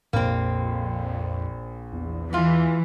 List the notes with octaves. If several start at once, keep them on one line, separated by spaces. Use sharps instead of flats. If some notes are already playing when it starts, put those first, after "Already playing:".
A#1 F2 A#3 C4
E2
E3 G#3 F4